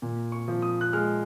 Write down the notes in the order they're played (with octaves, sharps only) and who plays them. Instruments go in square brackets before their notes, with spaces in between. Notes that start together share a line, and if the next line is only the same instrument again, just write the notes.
[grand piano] A#2
C#6
F3
D#6
F#6
G#3 F6